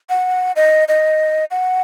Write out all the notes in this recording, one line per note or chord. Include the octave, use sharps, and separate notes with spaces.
F#5
D#5
D#5
F#5